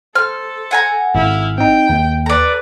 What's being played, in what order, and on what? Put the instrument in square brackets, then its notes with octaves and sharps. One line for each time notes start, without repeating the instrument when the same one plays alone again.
[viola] A4 [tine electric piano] C5 [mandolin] F6
[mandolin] F#5 G#5 A#5
[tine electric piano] G#1 [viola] E4 F5
[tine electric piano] C4 D#4 [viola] G5
[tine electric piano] D#2
[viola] A4 B4 [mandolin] D5 A#5